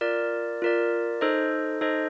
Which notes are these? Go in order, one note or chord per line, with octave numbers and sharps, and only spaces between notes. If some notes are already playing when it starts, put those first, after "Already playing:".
F4 A#4 D5
F4 A#4 D5
D#4 A4 C5 D#5
D#4 A4 C5 D#5